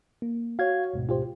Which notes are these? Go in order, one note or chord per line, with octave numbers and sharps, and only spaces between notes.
A#3
F#4 C#5 F5 G#6
D2 G#2 B2
F4 G4 C5